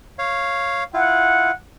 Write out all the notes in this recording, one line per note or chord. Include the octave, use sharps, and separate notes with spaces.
C#5 F5
E4 F4 F#5